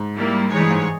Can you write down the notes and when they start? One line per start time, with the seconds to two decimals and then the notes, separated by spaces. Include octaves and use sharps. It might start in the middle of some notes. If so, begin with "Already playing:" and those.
Already playing: G#2
0.17 G3 A#3 E4
0.50 G#2 E3 G#3 D#4 G#4 C#5
0.60 G2
0.70 G#2